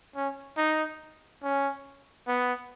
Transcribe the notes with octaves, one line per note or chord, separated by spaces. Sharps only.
C#4
D#4
C#4
B3